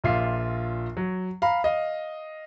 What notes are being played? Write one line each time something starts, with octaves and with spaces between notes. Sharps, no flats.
A#1 A#2 F4 E5 C7
F#3
F5 A#5 B5
D#5 F5